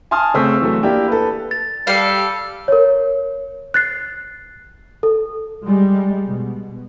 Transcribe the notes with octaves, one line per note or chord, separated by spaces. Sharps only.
G#5 A5 C6 D#6 F6
C#3 A3 C4 C#6 E6 B6
E3 F#3 A3
A#3 D4 E4 G4
A4 B4
A6
G3 A4 F5
A#4 C#5
F#6 A6 C7
A4
G3 G#3
B2